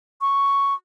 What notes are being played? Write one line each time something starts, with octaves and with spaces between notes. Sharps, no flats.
C#6